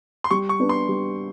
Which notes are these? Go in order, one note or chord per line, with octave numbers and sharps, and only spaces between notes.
C6
G3 C#6
C#6
B3 D4
C6
G3